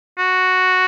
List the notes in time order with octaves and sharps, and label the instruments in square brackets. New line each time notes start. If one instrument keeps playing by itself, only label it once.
[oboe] F#4